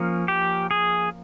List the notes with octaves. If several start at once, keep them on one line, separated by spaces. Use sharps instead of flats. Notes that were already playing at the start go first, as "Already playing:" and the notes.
Already playing: F3 A#3 C#4
G4
G#4